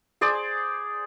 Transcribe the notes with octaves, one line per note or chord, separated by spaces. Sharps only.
G#4 C5 D5